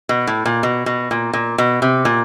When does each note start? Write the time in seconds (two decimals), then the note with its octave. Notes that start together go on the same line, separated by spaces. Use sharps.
0.09 B2
0.27 A2
0.46 A#2
0.63 B2
0.86 B2
1.11 A#2
1.33 A#2
1.58 B2
1.82 C3
2.05 A#2